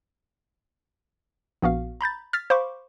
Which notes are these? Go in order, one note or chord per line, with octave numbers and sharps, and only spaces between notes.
A#1 B3 F#4 F5
A#5 B5 G6 A6
F6 A6 B6
C5 F5 B5 C#6 D6